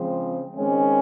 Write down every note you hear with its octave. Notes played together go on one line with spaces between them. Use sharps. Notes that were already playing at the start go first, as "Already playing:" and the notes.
Already playing: C#3 F3 G#3 C4
D#3 G#3 C4 C#4